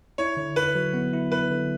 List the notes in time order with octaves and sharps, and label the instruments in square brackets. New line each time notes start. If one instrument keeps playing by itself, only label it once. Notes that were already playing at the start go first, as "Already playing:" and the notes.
[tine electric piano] E4 [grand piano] C#5
[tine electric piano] D3
[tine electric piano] D3 [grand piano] B4
[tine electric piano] F#3
B3
E4
[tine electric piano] E4 [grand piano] B4
[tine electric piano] D3